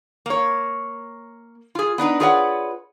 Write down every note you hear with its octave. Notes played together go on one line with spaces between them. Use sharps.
A#3 C#5
F4 G#4
B3 D4 D#4 B4
F4 G#4 B4 C#5 D5 F#5